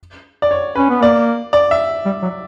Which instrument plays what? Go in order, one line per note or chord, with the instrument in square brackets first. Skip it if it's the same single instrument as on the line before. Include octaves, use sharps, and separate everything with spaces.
[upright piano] D5
C#5
[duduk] C#4 [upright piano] B4
[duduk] B3
[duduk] A#3 [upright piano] D5
[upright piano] D5
E5
[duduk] G3
F#3